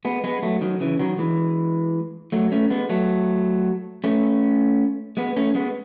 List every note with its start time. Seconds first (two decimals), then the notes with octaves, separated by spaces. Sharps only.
0.05 G#3 B3
0.24 G#3 B3
0.43 F#3 A3
0.61 D#3 F#3
0.81 C#3 E3
0.99 D#3 F#3
1.18 E3 G#3
2.32 F#3 A3
2.52 A3 C#4
2.70 G#3 B3
2.89 F#3 A3
4.04 A3 C#4
5.17 G#3 B3
5.36 A3 C#4
5.55 G#3 B3